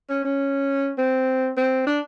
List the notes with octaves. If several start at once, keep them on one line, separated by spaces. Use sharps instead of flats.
C#4
C#4
C4
C4
D4